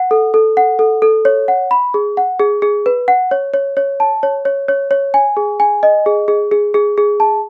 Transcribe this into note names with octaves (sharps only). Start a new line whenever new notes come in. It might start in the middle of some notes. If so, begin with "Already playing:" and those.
Already playing: F#5
A4
A4
F#5
A4
A4
C#5
F#5
B5
G#4
F#5
G#4
G#4
B4
F#5
C#5
C#5
C#5
A5
C#5
C#5
C#5
C#5
G#5
G#4
G#5
D#5
G#4
G#4
G#4
G#4
G#4
A5